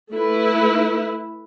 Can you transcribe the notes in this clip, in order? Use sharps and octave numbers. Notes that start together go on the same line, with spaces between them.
A3 E4 B4